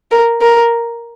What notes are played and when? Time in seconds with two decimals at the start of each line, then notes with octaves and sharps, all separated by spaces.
0.11 A#4
0.41 A#4